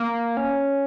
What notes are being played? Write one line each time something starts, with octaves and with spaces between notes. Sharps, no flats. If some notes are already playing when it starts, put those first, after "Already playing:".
Already playing: A#3
C#4